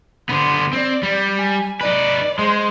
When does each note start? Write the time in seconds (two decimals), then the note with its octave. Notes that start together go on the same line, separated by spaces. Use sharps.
0.29 D3 B3 C5
0.73 C4 D5
1.03 G3
1.39 G#5
1.81 D#4 B4 D5
2.39 G#3 C5